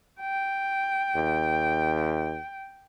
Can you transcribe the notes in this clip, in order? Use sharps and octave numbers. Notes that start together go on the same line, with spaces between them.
G5
D#2